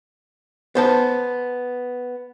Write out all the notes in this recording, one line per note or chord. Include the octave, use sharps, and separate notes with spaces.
B3 C5 A5